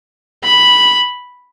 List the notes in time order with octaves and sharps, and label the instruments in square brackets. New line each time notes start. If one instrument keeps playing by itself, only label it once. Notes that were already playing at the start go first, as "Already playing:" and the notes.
[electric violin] B5